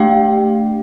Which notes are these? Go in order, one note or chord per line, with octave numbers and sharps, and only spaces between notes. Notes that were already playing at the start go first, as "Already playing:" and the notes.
Already playing: A3 D4 G4 F5 G5